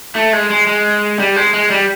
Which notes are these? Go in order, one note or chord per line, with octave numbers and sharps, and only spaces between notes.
A3
G#3
G#3
G#3
G3
G#3
G#3
G3